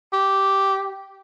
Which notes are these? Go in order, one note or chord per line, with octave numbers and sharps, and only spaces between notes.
G4